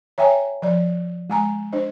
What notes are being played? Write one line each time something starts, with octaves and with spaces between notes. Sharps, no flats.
C#5 E5 G5 G#5 A#5
F3 D5
G#3 G#5 A#5
D4 C5 D#5